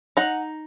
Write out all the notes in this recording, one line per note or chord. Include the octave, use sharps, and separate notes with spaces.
D#4 F#5